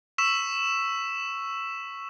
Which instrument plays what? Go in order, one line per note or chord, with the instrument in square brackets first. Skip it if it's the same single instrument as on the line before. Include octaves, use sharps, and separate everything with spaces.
[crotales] C#6 E6 B6 E7